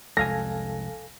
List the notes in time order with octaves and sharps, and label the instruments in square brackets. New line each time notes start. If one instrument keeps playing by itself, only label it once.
[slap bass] C2 F2 G#3 [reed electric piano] A4 F5 G#5 [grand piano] A#6